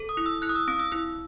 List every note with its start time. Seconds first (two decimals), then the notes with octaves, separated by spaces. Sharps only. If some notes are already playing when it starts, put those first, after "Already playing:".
Already playing: A4
0.09 D#6
0.17 E4
0.26 E6
0.42 E4 F#6
0.49 D#6
0.55 E6
0.68 C4 D#6
0.79 E6
0.92 E4 E6